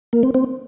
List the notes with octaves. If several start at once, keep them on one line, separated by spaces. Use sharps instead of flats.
A#3
C4
C4